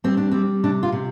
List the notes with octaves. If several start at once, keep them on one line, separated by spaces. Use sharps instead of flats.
G3 C4
D4
G3 C4
C3 D4
F4
C3